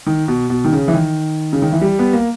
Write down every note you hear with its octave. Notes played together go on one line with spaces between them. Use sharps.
D#3
B2
B2
D#3
C#3
E3
D#3
C#3
D#3
E3
G3
B3
A#3